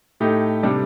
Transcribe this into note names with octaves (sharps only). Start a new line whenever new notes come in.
A2 A3 D#4 G4
C3 G3 D4 A4